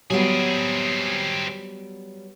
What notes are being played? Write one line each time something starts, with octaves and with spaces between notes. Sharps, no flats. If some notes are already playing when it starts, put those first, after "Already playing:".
F#3 G3 B3 C4 G#4